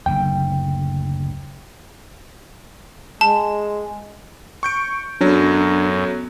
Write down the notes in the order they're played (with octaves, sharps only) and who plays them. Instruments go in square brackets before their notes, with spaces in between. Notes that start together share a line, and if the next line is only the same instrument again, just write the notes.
[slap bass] F#1 D2 [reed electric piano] G5
[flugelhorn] G#3 [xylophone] A5
[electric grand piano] C#6 G6 D7
[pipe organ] F#2 [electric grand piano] F#3 C#4 [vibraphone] B3 A4 [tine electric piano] D4